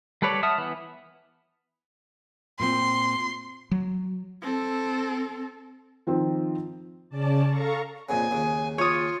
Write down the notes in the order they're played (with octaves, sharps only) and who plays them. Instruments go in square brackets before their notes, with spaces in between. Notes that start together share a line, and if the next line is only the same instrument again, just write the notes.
[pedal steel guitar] G3 A4 B4 C#5 D5
E5 F#5 A5 D#6 F6
E3 B3
[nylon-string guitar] A#2 C4 [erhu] C6
[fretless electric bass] F#3
[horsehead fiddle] C4 A4
[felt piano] D#3 F3 C4
[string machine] C#3 C#4 D5 A5
A4 F5 A#5 C#6
[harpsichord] F2 A#2 C#3 [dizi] G#5
[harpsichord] D#2 C#3
[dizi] F4 [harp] C#5 D#6